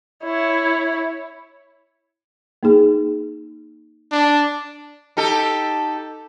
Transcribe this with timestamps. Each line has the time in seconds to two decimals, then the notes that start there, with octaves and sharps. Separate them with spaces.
0.24 E4 C#5
2.63 A#3 D#4 G#4
4.12 D4
5.17 D#4 G4 A4